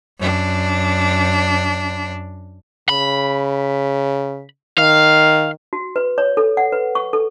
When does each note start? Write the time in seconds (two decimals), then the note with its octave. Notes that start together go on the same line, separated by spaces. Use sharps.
0.19 F#2 D4
2.89 C#3 B5
4.78 D#3 F5
5.73 F#4
5.96 B4
6.18 C#5
6.37 A4
6.57 F#5
6.72 B4
6.95 C#6
7.13 A4